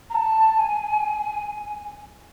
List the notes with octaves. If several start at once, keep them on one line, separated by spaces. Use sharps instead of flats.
A#5
A5
G#5